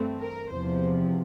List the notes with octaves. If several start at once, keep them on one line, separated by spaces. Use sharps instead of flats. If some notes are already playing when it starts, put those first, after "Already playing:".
Already playing: G2 E3 A3 C4
A#4
E2 C3 F3 C5